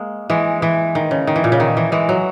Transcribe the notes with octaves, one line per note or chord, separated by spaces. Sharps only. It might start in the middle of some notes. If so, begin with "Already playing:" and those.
Already playing: G#3 A#3
E3 G#3
E3
D#3
C#3
D#3
E3
A#2
C#3
D#3
E3
E3 G#3
F#3